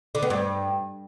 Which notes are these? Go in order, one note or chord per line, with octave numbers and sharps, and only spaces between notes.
D3
B3
G2